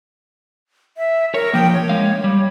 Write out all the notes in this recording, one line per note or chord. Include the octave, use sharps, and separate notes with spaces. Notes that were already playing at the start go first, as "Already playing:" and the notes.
E5
A#4 C#5
F3 A#3 G5
C#5
G#3 F5
G3